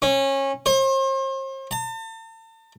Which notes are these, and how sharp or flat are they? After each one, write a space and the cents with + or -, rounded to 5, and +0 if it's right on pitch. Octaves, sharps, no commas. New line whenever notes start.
C#4 -25
C5 +40
A5 +40